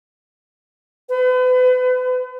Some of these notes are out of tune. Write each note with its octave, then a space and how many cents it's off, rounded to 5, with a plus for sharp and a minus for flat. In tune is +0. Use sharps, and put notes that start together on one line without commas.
B4 +40